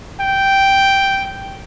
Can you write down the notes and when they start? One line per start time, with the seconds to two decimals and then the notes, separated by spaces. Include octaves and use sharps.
0.21 G5